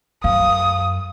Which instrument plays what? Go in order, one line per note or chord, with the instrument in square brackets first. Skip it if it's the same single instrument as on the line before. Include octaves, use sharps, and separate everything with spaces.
[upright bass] F#2 [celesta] F5 [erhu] D#6